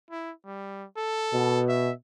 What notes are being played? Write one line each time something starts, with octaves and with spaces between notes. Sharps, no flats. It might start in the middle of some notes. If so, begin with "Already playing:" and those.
E4
G3
A4
B2
E5